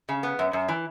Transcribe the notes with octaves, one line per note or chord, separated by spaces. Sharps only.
C#3
B3
F#2
F#2
E3